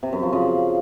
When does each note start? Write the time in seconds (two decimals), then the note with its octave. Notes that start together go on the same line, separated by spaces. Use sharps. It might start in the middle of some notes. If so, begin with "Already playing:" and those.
0.03 C3
0.13 F#2
0.23 F3
0.33 C#3